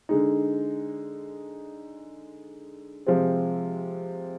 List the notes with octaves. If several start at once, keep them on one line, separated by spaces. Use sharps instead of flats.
D3 G#3 D#4
C3 F3 G#3 C4